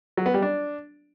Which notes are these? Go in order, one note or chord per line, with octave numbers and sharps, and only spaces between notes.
F#3
B3
G3
D4